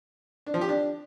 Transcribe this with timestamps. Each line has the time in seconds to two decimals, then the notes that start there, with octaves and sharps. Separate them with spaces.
0.46 D4
0.54 F3
0.61 G4
0.69 D4